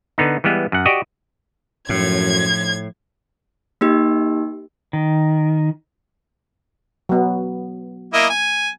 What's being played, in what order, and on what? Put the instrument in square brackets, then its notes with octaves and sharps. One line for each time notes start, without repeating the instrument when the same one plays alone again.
[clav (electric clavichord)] D3 B3 D#4
E3 G3 G#3 B3
F#2 F#5
F#4 G4 D5 D#5
[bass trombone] F#2 [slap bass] A2 [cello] F3 [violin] G#6
[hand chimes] A#3 D#4 G4
[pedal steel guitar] D#3
[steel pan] F#3 B3
[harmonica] A#3 E4 D#5
G#5